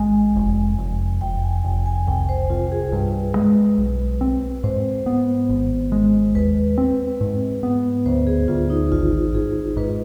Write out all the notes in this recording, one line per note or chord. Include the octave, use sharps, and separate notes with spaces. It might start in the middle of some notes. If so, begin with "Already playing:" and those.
Already playing: G#1 G#3 G#5
F1
F1
F1 G5
G#5
F1 G5
G#5
C2 G5
C5
C2 F4
G#4
G2 B4
G#3
B1
C4
G#2 C5
B3
G#1
G#3
D#2 B4
C4
G#2
B3
D2 C5
G#4
D2 F4
D#4
G#1 F4
G#1 G#4
G#2 B4